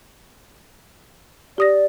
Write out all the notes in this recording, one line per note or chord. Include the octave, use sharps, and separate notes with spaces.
G4 D5 D#6 A#6